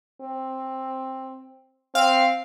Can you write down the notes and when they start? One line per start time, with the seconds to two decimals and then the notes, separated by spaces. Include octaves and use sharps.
0.21 C4
1.95 C4 F5